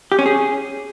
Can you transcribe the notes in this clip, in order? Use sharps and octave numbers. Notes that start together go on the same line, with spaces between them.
G4
C#4
G#4